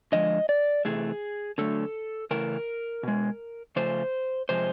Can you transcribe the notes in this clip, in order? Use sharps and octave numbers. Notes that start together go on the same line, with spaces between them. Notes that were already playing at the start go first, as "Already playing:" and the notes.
D3 F3 G#3 D#5
D5
C3 E3 A3 G#4
D3 F#3 A3 A4
C#3 E3 A3 A#4
B2 G#3
C#3 F3 A3 C5
C3 F3 G#3 C5